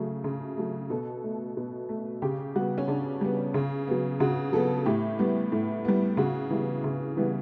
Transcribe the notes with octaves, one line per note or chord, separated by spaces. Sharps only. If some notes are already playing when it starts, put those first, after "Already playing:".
Already playing: C#3 F#3 A3
C#3
F#3 A3
B2 A4
A3
B2
A3
C#3 G4
G3 B3 F#4
C#4
C#3 D4
G3 B3
C#3
F#3 B3
C#3 F#4
F#3 B3 A4
A2 G4
G3 B3
A2
G3 B3
C#3 F#4
E3 G3 B3
C#3
E3 G3 B3